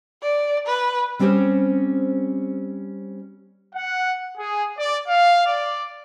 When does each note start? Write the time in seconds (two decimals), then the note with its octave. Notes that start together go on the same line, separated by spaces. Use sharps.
0.22 D5
0.66 B4
1.19 G3 C4 C#4 G4 C5 C#5
3.74 F#5
4.37 G#4
4.78 D5
5.08 F5
5.47 D5